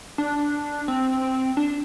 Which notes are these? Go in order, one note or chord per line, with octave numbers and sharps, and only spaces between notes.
D4
C4
D4